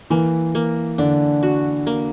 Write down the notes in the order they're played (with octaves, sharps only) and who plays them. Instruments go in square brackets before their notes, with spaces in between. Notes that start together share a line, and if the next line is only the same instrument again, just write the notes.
[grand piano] E3 [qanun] A#3
[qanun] A#3
[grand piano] D3 [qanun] D4
[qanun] F#4
A#3